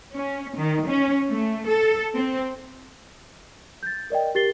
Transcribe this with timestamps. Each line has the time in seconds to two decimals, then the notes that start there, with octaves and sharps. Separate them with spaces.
0.15 C#4
0.57 D#3
0.88 C#4
1.29 A3
1.67 A4
2.16 C4
3.83 G6 A6
4.10 A#4 D5 D#5 G5
4.35 G4 A#4 A6 C7 G7